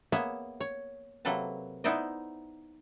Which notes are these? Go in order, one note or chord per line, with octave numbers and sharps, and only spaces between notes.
A#3 B3 G#4 C#5 E5
C#5
C3 F#3 A#3 A4 B4 A5
B3 D#4 E4 C5 D5 D#5